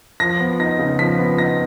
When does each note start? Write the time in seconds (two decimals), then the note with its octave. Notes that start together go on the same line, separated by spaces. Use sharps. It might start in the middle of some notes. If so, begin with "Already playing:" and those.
0.20 F3 A#6
0.40 B3
0.60 D#4 A#6
0.79 C#3
0.99 F3 B6
1.18 B3
1.38 D#4 A#6